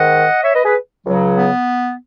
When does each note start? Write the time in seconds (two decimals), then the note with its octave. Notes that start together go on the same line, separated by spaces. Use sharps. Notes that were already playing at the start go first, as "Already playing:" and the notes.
Already playing: G#2 D#3 D#5 F#5
0.43 C#5 E5
0.54 B4 D#5
0.64 G#4 B4
1.05 C#2 C#3 F#3
1.37 B3